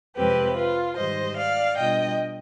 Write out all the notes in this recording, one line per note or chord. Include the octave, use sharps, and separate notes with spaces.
F2 C3 F3 G#3 C4 G4 B4
F4
G#2 D#3 G3 C5 D#5
D5 F5
B2 G3 D4 F4 D#5 G5